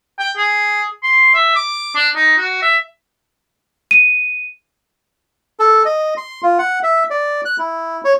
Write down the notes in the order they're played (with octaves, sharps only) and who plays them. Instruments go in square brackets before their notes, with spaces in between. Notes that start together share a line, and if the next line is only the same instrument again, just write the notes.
[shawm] G5
G#4
C6
E5
D6
D4
D#4
F#4
E5
[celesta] D#7
[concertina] A4
D#5
C6
F4
F#5
E5
D5
F#6
E4
C#5